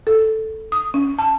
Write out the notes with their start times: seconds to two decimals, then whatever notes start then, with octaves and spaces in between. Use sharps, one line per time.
0.07 A4
0.72 D#6
0.94 C#4
1.19 A5